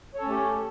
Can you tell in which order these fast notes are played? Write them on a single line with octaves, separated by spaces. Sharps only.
C#5 A4 C#4 A3 G4